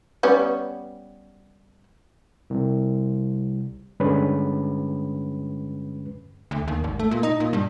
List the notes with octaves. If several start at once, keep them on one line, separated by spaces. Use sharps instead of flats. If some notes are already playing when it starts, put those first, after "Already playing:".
G3 B3 C#4
C2
G2 D3 G#3 C#4 B4
D2
D#2
G#1
A3
A#2
D#4
A#2
G2